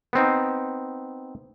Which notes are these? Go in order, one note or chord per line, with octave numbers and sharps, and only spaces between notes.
B3 C4 D#4